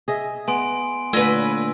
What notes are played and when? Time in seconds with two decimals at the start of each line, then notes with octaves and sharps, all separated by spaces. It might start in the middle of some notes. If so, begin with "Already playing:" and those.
0.08 G#4 D#5 E5
0.48 B3 G#5 C6 D7
1.13 A#2 D3 A3 C#4 B4 E6 A#6